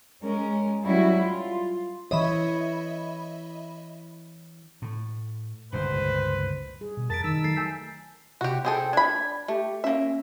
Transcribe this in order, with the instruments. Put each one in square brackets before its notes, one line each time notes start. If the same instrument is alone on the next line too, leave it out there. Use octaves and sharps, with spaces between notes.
[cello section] G#3 C#4 A#4
F#3 G3 C#4 E4 F#4
F4
[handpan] E3 C#5 [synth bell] D#5 E5 B5
[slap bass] A2
[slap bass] G1 C#2 A#2 [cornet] B4 [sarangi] C5
[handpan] G3 G#4
[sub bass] B2
[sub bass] F2 [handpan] A#4 [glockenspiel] A5 B6 D7 [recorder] A6
[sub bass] D#3 [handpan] D#4 [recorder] E6 [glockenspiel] B6 E7
[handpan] F#3 A3 A4 [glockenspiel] A6 C7
[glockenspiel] G#5 G6 B6
[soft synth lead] C3 [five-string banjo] F#4 G4
[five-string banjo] C4 G#4 A4 [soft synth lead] G5
[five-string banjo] D4 B5 [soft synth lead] G#6
[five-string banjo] A3 [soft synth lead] G4
[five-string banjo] A#3 E5 [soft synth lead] C#4